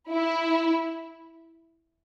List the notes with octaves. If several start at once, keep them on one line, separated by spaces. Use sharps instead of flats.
E4